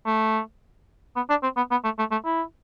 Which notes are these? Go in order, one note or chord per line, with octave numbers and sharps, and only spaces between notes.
A3
B3
D4
C4
B3
B3
A3
A3
A3
E4